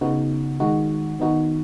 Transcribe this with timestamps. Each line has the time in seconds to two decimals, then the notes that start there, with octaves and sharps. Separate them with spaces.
0.01 C#3 B3 D#4 F#4
0.60 D#3 G#3 D#4 F#4
1.20 D#3 B3 D#4 F#4